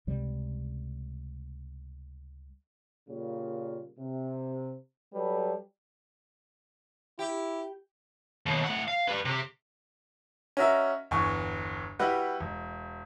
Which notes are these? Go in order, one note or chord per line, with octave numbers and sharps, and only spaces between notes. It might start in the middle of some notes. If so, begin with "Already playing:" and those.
C#2 C3 G3
A#2 C#3 G3 A#3
C3
F#3 G3 A4 B4
E4 G4
D#2 B2
A2 F#5
F5
G4 B4
C3 G4
C#4 D#4 F#4 A#4 E5
G1 E2 G#5 C#6
G3 E4 F#4 G4 B4 F#5
E1